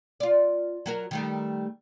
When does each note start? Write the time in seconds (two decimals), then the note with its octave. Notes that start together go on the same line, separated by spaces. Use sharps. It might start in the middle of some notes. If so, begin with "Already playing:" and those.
0.20 F4 D5
0.86 F#3 F#4 A#4
1.11 D#3 G3 A3